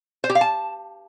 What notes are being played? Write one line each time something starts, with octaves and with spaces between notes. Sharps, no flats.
C5
G4
F5
A5